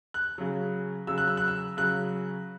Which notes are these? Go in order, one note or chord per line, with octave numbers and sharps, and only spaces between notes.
F#6
C#3 F#3
C#3 F#3 E6
F#6
E6
F#6
E6
C#3 F#3 F#6